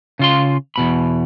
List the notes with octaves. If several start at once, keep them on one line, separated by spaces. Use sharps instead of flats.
C#3 F4 C6
E2 B2 B5